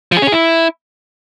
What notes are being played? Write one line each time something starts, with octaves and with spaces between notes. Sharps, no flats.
F3
G#4
C#4
G#4
E4